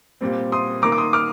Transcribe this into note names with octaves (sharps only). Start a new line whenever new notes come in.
A#2 G3 C4
C6 D#6
D#3 A#3 A#5 D6
D6
C6 D#6
D6 F6